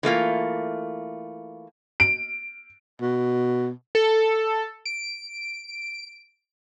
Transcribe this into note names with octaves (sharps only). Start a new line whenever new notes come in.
E3 A3 A#3 F4
D7
B2
A4
D7